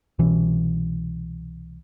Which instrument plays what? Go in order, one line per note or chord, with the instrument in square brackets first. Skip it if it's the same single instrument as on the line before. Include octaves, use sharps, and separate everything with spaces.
[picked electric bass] C2 B2 E3 C#4